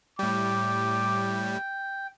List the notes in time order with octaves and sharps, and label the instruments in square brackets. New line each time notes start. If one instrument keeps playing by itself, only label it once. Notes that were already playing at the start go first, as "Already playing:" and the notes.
[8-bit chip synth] A2 G3 [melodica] G5 [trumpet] D6